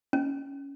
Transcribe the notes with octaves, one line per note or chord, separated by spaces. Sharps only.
C#4